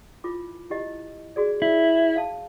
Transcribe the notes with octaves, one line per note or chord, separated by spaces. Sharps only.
E4 F4 D6
E4 G4 D#5
F#4 G#4 D5
E4
F5 A5